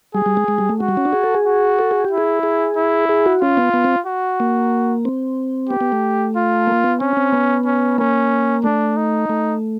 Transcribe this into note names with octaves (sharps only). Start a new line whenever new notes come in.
G3 G#4
G3
G#3
G#3
G3
A3
G#3 F#4
G3
C#4
D4
G#4
A4
G#4
F#4
A4
G#4
G4
E4
G#4
G#4
E4
G#4
F#4
C#4 F4
B3
B3
C4
F#4
A#3
C4
B3 G4
B3
A3
F4
A#3
B3
C4 C#4
C4
B3
C#4
A#3 C#4
A3 D4
D#4
A3